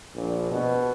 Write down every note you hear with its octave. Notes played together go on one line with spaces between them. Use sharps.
A#1
B2